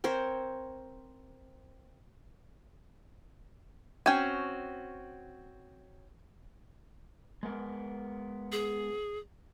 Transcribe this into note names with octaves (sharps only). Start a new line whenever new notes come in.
C4 A#4 C5 C#5
C4 C#4 F#4 G5 G#5
G#3 B3 A#4
G#4